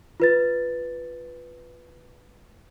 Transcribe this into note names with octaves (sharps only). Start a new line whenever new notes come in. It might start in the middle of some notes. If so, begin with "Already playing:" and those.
F4 B4 A6